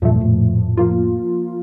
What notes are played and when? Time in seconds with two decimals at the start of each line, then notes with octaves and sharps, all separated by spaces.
0.02 E2 G2 A#2 F3 A3
0.20 F2 A2
0.77 F3 A#3 F4